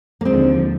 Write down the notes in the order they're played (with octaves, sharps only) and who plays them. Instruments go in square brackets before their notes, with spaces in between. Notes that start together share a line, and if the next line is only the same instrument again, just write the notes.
[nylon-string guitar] A#3
[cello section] D#2 D3 F3 [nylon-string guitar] G#3 C4